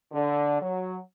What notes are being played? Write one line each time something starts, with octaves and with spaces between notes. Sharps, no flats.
D3
F#3